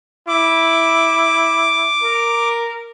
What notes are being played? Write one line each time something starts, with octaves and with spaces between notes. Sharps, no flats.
E4 D6
A#4